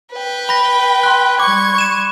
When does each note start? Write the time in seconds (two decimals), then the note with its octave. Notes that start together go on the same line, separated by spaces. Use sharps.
0.13 B4 G5
0.49 B5 A#6
1.03 C6 F#6
1.40 G3 C#6 D6 G#6
1.78 D#7 E7